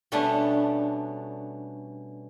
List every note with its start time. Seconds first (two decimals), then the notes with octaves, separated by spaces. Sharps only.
0.12 B2 G3 A3 B3 C#4 D4